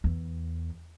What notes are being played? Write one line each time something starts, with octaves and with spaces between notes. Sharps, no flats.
E2